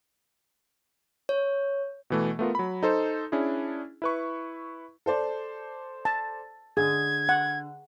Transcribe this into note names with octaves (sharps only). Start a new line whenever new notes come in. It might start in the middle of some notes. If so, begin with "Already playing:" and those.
C#5
B2 E3 A3
A3 B3 F4 A#4
F#3 B5
D#4 A4 C5
C#4 D4 E4 G#4
E4 B4 C#6
A4 C5 D5
A5
D3 G#4 G#6
F#5